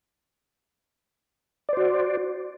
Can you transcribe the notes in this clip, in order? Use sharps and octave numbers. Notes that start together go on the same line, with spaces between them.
F#4 C5 D5